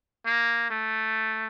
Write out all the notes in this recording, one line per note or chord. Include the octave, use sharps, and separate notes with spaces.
A#3
A3